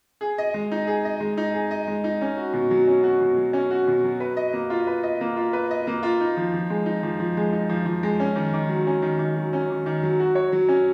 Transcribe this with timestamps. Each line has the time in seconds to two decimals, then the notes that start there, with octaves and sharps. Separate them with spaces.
0.21 G#4
0.38 D#5
0.54 G#3
0.71 D#4
0.87 G#4
1.05 D#5
1.20 G#3
1.37 D#4
1.54 G#4
1.71 D#5
1.87 G#3
2.04 D#4
2.21 C#4
2.37 F#4
2.53 B2
2.71 F#3
2.87 C#4
3.04 F#4
3.21 B2
3.37 F#3
3.53 C#4
3.71 F#4
3.88 B2
4.04 F#3
4.20 B4
4.37 D#5
4.53 A#3
4.70 F4
4.87 B4
5.03 D#5
5.21 A#3
5.36 F4
5.53 B4
5.71 D#5
5.87 A#3
6.03 F4
6.21 D#4
6.37 F3
6.54 F3
6.70 G#3
6.86 D#4
7.03 F3
7.20 F3
7.37 G#3
7.53 D#4
7.69 F3
7.86 F3
8.03 G#3
8.20 C#4
8.36 D#3
8.53 D#3
8.69 F#3
8.87 C#4
9.02 D#3
9.19 D#3
9.36 F#3
9.53 C#4
9.70 D#3
9.86 D#3
10.03 F#3
10.20 F#4
10.35 C#5
10.52 F#3
10.68 C#4